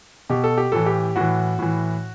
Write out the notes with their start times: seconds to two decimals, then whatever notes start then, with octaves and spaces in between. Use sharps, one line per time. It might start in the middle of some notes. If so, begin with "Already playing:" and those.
0.30 B2 G4
0.44 A4
0.58 G4
0.72 A2 E3 A4
0.86 G4
1.16 A2 E3 F#4
1.59 A2 E3